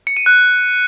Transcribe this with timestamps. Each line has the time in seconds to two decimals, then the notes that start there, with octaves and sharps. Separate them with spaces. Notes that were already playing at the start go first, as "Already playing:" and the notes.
0.07 C#7
0.17 D#7
0.26 F#6